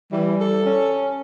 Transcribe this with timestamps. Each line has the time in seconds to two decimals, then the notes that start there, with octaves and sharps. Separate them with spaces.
0.12 E3 G3
0.41 A4
0.65 C#4